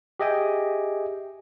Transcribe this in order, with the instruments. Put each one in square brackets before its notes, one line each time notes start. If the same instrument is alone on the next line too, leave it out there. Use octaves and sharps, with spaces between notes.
[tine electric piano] G4 G#4 D#5 E5 G5 G#5